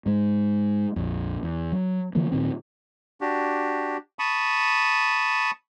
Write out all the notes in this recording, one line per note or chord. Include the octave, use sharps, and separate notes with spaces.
G#2 G#3
A#1 F2
E2
F#3
D3 E3 F3 A#3
D#1 A#2 D#3 C4
D4 F#4 G4
A5 B5 C#6 D#6